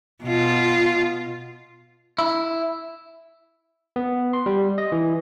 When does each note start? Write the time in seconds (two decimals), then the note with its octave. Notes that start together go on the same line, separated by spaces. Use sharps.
0.24 B2 F4
2.19 E4
3.96 B3
4.33 C6
4.46 G3
4.78 D#5
4.92 E3